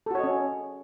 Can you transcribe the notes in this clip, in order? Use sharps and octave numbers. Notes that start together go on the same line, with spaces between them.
C#4 F#4 A4 C#5 D#5